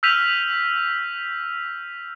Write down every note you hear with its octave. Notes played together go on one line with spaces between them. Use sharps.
E6 F6 G6 B6 D#7 F7